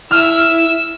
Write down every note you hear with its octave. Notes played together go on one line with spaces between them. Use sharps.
E4 E5 E6 F6